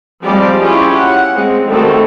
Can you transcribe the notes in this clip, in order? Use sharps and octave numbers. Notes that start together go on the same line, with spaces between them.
F3 G3 G#3 C4 G4 D5
C#4 E4 F4 G4 G#4
F#5
G#3 C4
D#3 G3 A3 C4 F#4 A4